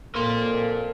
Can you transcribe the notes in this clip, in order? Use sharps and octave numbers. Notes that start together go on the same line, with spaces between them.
F2 A#2 A#3 A4 A#4 C6